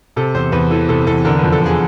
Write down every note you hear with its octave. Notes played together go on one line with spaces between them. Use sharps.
C3 A4
E2 C5
E2 B4
E3 A4
C3 A4
E2 A4
D3 A#4
F2 B4
A4
D3 G#4